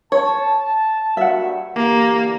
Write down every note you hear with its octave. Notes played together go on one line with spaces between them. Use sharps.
C#5 A5
G2 A#3 F#4 E5 F#5
D3 E3 A#3 G4